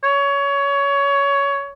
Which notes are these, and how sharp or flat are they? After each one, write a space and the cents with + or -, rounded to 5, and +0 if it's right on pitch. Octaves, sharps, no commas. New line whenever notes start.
C#5 +20